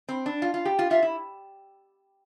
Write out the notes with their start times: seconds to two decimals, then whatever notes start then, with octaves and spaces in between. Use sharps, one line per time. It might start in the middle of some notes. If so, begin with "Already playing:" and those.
0.09 C4
0.26 D4
0.42 F4
0.54 F4
0.65 G4
0.79 F4
0.90 F4 E5
1.02 E4